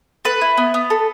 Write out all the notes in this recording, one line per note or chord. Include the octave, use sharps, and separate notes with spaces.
A4 B4
E4
B3
B3
A4